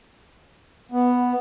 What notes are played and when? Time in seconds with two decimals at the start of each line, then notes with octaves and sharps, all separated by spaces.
0.92 B3